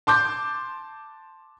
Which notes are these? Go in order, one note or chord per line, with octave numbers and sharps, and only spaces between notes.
A5 C6 D6 G6